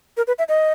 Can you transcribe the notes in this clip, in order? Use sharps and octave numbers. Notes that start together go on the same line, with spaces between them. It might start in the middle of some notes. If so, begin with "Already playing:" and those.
A#4
B4
E5
D#5